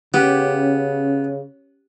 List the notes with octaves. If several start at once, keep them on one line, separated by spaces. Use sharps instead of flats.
C#3 B3 C#4 G4